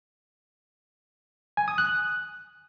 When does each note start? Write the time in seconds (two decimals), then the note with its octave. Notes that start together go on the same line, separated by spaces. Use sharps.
1.57 G#5
1.68 D#6
1.78 F#6